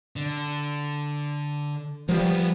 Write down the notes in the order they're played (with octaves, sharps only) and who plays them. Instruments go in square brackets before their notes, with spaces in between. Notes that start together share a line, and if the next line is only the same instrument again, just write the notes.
[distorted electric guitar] D3
[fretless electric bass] F3 G3 [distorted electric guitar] A#3 B3